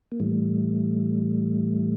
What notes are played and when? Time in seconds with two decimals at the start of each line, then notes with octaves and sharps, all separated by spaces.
0.12 A#3
0.20 A2 E3 G3 A3